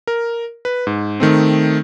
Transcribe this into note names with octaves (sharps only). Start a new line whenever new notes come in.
A#4
B4
G#2
D#3 A3 C4